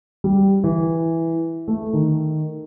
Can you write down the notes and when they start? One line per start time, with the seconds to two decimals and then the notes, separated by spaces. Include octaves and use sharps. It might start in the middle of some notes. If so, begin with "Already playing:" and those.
0.24 G3
0.64 E3
1.68 A3
1.93 D#3